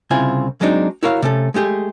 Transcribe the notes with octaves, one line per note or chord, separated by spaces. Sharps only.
C2 C#3 C4 E4 F4 G#5
F#3 G#3 C4 D4 D#4
E4 F#4 A#4 C#5 F5
C3 A3 C#4 A4
G#3 A3 G4 G#4